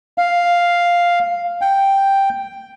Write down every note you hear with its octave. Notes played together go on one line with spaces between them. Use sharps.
F5
G5